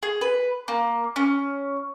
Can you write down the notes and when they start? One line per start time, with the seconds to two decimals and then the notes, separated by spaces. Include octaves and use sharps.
0.03 G#4
0.21 B4
0.68 A#3
1.16 C#4